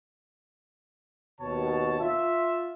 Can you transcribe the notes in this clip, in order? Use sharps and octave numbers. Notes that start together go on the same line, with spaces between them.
D#2 B2 C#5 A5
F4 E5